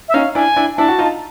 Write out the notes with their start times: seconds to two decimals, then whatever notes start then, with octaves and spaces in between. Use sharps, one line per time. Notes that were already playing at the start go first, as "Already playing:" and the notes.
0.09 E5
0.14 C#4 D#4 F5
0.35 D4 E4 G#5
0.56 D4 E4
0.78 D4 E4 A5
0.88 F#4
0.99 D#4 F4